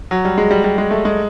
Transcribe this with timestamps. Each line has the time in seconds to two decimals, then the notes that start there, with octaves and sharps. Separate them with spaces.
0.11 F#3
0.25 G3
0.38 G#3
0.51 G3
0.64 G3
0.78 G#3
0.91 A3
1.05 G#3